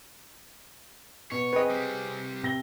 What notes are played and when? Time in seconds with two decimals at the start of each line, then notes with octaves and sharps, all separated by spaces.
1.32 B2 C#5
1.53 C4 G#4 B4 D#5
1.70 C3 G3
2.43 C3 A#6 G7